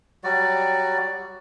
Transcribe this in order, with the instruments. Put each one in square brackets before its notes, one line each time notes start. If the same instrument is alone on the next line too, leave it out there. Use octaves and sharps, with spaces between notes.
[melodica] F#3 G3 F#4 D5